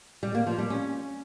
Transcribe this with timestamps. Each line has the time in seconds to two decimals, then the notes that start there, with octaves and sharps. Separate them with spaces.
0.23 G3
0.35 A#3
0.46 F3
0.58 G3
0.70 C#4